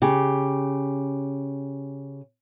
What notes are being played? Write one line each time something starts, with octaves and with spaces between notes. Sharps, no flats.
C#3 G4